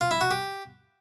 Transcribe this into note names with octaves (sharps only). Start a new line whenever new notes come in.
F4
E4
F#4
G4